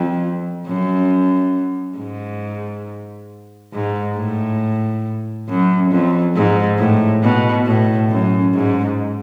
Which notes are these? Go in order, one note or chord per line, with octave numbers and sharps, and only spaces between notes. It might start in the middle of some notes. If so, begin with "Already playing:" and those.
Already playing: F2
F#2
G#2
G#2
A2
F#2
F2
G#2
A2
B2
A2
F#2
G#2